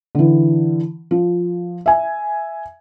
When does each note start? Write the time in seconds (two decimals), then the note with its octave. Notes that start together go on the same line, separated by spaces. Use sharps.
0.15 D3 E3
1.11 F3
1.86 E5 G#5